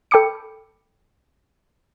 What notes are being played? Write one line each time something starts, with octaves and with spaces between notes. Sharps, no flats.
A4 G5 B5 D6 C#7